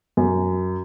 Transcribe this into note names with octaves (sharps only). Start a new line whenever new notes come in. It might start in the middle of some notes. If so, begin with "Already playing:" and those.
F#2